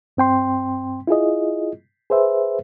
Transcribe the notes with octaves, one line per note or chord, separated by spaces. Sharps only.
G2 C4 G5 C6
E4 F4 G#4 D#5
G#4 B4 C5 E5